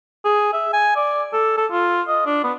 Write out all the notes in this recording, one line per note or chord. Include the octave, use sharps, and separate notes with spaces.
G#4
E5
G#5
D5
A4
A4
F4
D#5
D4
B3